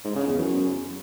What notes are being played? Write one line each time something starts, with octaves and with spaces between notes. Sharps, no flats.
G#2
C#3
E2
F#2